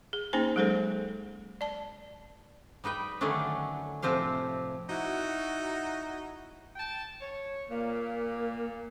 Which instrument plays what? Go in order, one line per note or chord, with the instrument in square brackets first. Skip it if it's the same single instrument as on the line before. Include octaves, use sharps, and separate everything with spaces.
[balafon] G#4
A#3 C#4 D#4 G#4 C5 G#5
F#3 G#3 G#4 A4 C5
D5 A5
[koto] G3 D#4 B4 G5
D3 D#3 F#3 A3 C#4 D4
A2 C3 F3 C4 G4 F5
[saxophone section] D#4 E4 F#4
[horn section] G5 A5
C#5
[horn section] A#2 [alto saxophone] A#3